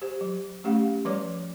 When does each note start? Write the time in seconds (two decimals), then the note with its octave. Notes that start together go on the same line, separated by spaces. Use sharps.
0.02 G4 C5
0.21 F#3
0.64 A3 C#4 G4 F5 F#5
1.05 F3 G3 B4 C#5 D5 D6